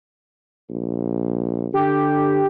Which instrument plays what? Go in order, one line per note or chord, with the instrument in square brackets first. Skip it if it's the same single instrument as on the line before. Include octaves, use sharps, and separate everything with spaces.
[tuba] A#1
[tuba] D3 [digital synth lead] G4